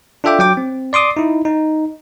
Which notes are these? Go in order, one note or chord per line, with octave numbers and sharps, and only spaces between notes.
D4 F4 A4 E5 G5 D6
F#3 G5 D6
C4
D5 C6 D6 D#6
D#4 E4
D#4